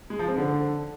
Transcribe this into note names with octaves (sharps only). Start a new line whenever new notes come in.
G#3
F3
C4
D3